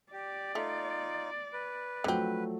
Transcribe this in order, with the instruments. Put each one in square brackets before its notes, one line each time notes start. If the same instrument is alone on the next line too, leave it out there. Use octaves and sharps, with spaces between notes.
[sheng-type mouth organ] G4 [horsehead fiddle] D5
[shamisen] A3 [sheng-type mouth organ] D#4 F4
[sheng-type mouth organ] B4
[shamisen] D3 C4 [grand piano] F3 F#3 A3